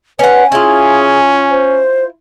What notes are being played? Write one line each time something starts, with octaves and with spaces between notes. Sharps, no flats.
C#4 B4 F#5 G#5
C#4 E4 F4 G#4
C5